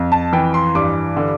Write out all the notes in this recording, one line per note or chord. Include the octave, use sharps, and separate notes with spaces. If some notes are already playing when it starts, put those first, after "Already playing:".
Already playing: F2
A5
E3 G5
C6
G2 D6
D3